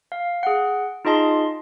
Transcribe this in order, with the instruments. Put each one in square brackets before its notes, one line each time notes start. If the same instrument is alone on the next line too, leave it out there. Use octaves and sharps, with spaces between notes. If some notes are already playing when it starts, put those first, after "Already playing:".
[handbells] F5
G#4 F#5
D#4 F4 G#4 D#5 A5 C6